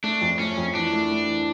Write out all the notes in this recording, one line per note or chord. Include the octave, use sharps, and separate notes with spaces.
A3 D4
F2
A3 C#4
F2
E3 D4
A3
A3
E3